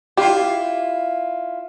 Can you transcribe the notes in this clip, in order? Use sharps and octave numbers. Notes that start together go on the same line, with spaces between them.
E4 F4 G4